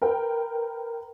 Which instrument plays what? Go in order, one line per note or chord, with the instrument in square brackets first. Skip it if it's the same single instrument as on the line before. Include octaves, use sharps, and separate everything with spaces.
[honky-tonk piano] A#4 B4 G5